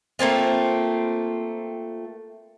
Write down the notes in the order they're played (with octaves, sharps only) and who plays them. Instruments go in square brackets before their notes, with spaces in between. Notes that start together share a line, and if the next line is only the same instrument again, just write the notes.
[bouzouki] A3 A#3 C4 F4